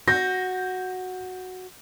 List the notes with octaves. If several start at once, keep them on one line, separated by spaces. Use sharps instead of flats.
F#4 G6 A#6